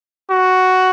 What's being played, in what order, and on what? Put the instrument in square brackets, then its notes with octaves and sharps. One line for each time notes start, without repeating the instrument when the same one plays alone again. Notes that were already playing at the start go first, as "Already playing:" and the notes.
[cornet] F#4